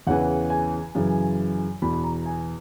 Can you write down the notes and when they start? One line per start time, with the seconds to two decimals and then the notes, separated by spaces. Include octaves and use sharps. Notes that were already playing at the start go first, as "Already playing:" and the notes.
0.07 E2 C#3 E3 F#5
0.50 G#5
0.95 F#2 C#3 E3
1.82 E2 B2 B5
1.93 B5
2.04 A#5
2.26 G#5